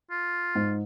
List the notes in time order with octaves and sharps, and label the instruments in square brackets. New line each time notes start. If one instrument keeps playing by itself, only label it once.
[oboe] F4
[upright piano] G#2